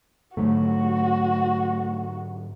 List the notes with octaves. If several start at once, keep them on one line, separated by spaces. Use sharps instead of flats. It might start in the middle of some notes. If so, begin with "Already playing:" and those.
G#2 D3 F#3 A3 F#4